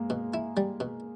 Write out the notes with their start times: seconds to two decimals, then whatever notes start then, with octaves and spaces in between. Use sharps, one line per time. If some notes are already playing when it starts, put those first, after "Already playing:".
Already playing: G#3 A#3
0.10 B2
0.34 E4
0.57 G3
0.80 B2